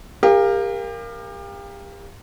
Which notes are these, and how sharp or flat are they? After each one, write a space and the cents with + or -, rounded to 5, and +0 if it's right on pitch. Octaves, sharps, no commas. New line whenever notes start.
G4 +35 A#4 +0 F5 +0